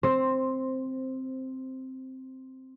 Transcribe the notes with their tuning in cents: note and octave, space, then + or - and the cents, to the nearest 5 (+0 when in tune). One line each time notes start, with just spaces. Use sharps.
C4 +0 C5 +10